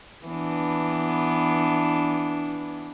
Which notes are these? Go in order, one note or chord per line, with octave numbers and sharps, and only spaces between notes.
E3 B3 D4